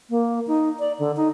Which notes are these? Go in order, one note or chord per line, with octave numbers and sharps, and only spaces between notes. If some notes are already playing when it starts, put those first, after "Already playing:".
A#3
D#4
D5
D3
D#4